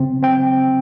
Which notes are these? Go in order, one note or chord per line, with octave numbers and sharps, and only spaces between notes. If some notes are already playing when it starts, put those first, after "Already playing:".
Already playing: C#3 C4
C4 G5